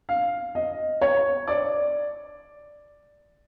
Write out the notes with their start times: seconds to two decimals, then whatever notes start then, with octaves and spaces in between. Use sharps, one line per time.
0.09 F5
0.55 D#5
1.01 C#5
1.48 D5